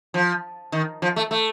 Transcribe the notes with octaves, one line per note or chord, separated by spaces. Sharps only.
F3
D#3
F3
A3
A3